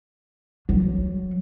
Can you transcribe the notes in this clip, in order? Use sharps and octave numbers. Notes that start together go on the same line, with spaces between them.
F#3